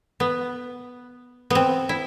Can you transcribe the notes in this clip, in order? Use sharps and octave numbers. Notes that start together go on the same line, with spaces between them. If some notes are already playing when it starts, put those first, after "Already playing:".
B3
B3 C4
E4